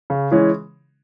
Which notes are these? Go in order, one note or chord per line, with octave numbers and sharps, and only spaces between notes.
C#3
E3 G#3 C#4